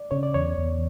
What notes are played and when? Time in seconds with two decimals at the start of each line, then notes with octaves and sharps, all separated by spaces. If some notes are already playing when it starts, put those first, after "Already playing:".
Already playing: D5
0.11 C#3 C#5
0.23 D5
0.34 E2 C#5
0.58 E2